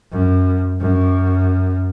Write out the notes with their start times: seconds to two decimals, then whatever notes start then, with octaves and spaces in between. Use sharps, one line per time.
0.12 F#2
0.80 F#2